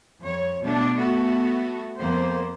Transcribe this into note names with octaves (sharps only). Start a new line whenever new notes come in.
F2 C#5
B2 A3 D4
A3 B3 F#4
F2 A#3 B3 C5